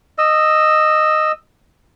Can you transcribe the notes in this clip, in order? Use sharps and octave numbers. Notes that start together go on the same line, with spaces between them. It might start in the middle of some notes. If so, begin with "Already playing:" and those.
D#5 E6